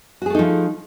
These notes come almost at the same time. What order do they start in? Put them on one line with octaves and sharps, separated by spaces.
F#4 G#4 A3 D#4 F3